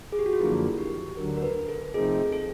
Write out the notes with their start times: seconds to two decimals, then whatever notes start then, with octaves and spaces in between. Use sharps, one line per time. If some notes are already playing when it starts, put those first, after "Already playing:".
0.12 G#4
0.19 G4
0.26 F#4
0.33 F4
0.40 F#2 D3 F3 A#3 E4
0.79 G4
1.17 D2 D3 F#3 A#4
1.37 A#4
1.43 B4
1.68 A4
1.94 C3 F3 A3 C4 D#4 G#4
2.32 A4